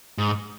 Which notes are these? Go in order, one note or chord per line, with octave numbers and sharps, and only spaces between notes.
G#2